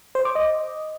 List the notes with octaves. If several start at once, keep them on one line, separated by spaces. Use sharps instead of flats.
C5
D6
D#5